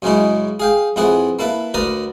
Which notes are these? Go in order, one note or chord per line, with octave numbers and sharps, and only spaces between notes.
F#2 C#3 G#3 C#4 D#4 E4
G#4 F5 G5
F2 E3 E4 G#4 F#5 C#6
A#3 E4 A4 B4 E5
D2 A#4 B4 D5 A#5 D#6